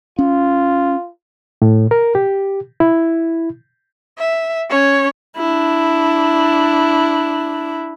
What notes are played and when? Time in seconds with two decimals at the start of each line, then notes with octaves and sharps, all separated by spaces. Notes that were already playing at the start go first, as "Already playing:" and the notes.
0.19 C#4 F4
1.62 A2
1.91 A#4
2.15 G4
2.80 E4
4.18 E5
4.70 C#4 C#5
5.38 D4 E4